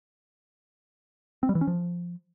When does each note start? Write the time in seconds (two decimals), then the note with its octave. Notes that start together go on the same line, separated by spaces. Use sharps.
1.43 C4
1.49 G3
1.55 E3
1.61 C#4
1.67 F3